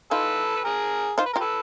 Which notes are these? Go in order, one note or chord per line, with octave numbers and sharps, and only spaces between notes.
D#4 F4 A4 B4
B4
G#4 A#4
D#4 F4 C5
B4
A#4
F4 G4
A4 B4